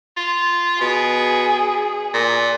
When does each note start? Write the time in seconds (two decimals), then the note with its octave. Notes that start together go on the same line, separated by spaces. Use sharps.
0.17 F4
0.81 B2 G#4
2.14 A#2